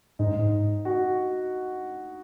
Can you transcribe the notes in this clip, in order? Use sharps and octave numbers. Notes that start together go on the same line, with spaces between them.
G#2 D#4
G#2
F#4